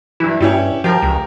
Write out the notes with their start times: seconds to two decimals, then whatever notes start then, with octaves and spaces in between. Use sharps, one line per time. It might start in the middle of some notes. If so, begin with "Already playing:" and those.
0.20 G2 E3 E4
0.40 G2 C#4 E4 G4
0.84 F3 G4 A#4
1.02 C#2